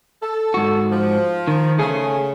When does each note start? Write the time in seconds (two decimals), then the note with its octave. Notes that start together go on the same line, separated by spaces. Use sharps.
0.22 A4
0.54 G#2 F#4
0.91 F3
1.48 D#3
1.79 C#3 A3 G#4